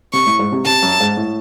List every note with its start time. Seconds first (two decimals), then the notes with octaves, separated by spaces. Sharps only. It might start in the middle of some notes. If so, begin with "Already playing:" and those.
0.13 C3 C#6
0.26 A2
0.39 G#2
0.52 C3
0.65 C3 A5
0.82 F#2
1.00 G#2
1.17 A2